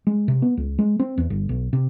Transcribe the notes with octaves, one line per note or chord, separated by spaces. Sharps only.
G#3
C3
B3
C#2
G#3
C4
E2
G1
B1
C3